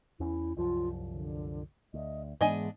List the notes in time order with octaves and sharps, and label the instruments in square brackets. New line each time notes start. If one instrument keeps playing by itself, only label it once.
[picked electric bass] E2 C#4 [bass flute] E4
[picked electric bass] C2 F#2 F3 [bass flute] F4
[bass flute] D3
[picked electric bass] D2 [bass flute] D#5
[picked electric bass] G#2 E3 B3 [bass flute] G#3 [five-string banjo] D4 D#5 G#5